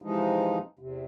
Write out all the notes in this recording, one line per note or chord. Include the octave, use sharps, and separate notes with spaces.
C3 E3 F3 G#3 D#4
E2 C3